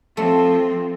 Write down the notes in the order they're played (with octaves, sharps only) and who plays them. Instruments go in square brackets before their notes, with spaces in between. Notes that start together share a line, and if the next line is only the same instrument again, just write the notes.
[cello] F3 C4 [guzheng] A3